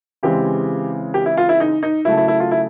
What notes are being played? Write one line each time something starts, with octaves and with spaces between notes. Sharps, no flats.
C#3 E3 G#3 C4 G4
G4
E4
F4
E4
D#4
D#4
C#3 F#3 A3 E4
E4
E4
F4
E4